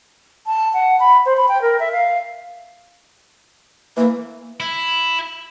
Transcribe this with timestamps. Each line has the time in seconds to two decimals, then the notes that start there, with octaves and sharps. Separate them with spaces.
0.47 A5
0.74 F#5
1.00 B5
1.26 C5
1.37 B5
1.48 G5
1.62 A#4
1.80 E5
1.92 F5
3.97 E3 A#3
4.60 E4